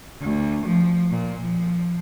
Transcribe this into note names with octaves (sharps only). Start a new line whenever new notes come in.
D2
F3
A#2
F3